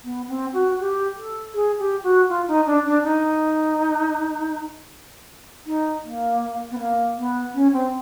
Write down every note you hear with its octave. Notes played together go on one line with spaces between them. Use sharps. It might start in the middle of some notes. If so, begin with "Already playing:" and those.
B3
C4
F#4
G4
A4
G#4
G4
F#4
F4
D#4
D4
D4
D#4
D#4
A#3
B3
A#3
B3
C#4
C4